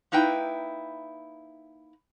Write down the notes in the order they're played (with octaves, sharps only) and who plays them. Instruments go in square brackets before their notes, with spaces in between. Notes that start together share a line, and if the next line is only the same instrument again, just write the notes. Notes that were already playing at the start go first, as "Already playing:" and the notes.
[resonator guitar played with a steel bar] A#3 D#4 E4 B4 G5